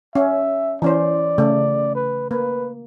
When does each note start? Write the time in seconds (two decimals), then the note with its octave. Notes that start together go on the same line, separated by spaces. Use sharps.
0.15 C#4 E5
0.82 E3 C#4 C5 D5
1.38 C#3 A3
1.95 B4
2.31 A#3 B4